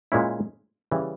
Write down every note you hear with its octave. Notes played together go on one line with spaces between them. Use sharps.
A#2 G#3 C#4 E4
C#3 E3 G3